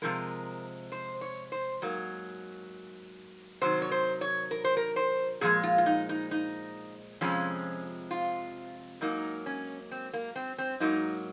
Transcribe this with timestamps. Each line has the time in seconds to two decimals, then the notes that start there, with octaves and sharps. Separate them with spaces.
0.02 C3 F3 G#3 A#4
0.92 C5
1.21 C#5
1.52 C5
1.82 G#2 F#3 A#3
3.61 C3 D#3 F#3 C5
3.82 C#5
3.92 C5
4.21 C#5
4.51 A#4
4.64 C5
4.77 A#4
4.96 C5
5.41 A#2 F3 G#3 G#4
5.63 F4
5.78 F4
5.86 D#4
6.09 D#4
6.31 D#4
7.21 F2 C3 F3 G#3 C#4
8.11 F4
9.01 G#2 F#3 A#3 D#4
9.46 C#4
9.91 C4
10.13 A#3
10.36 C4
10.58 C4
10.80 G#2 F#3 A#3 D#4